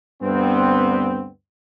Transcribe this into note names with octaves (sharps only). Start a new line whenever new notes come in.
D2 G2 B3 C4